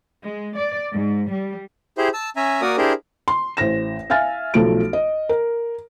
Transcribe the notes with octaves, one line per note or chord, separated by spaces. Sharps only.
G#3
D5
G#2
G3
E4 G4 G#4 C5
A5 E6
C#4 E5 G#5 A#5
A#3 F#4 A#4 D5 D#6
D4 E4 G4 G#4 A#4 C5
C6
A1 C5 A#6 E7
E5 F5 G#5 F6 A6
B1 F3 A3 A4 D7
D#5
A#4